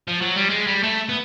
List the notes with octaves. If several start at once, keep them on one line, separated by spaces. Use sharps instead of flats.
F3
F#3
G3
G#3
G3
A3
B3